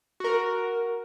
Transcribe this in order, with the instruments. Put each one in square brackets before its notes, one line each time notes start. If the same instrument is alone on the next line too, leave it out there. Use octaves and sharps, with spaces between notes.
[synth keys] F#4 A#4